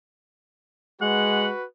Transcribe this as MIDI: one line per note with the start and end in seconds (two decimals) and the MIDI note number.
1.01 1.51 56
1.01 1.64 66
1.01 1.64 71
1.01 1.46 78